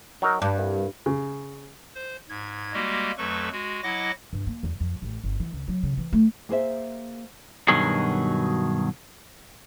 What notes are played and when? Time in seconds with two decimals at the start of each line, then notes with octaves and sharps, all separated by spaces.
0.22 F#3 D#4 A#4
0.42 G2 D4
0.58 C2
1.06 C#3
1.95 C5
2.29 G#2 G#6
2.74 G3 G#3 A#3 F#4 G4
3.18 F2 F#3 A3 A4 B4 C#6
3.52 G#3 F#4
3.83 F#3 E4 D#5 F#5 D6 A#6
4.33 G2
4.46 A#3
4.63 E2
4.80 F2
5.02 A1
5.23 G1
5.40 E3
5.53 C#2
5.68 F#3
5.83 C#3
5.98 E3
6.13 A3
6.49 A#3 G#4 C5 E5
7.68 G2 B2 D#3 F#3 G#4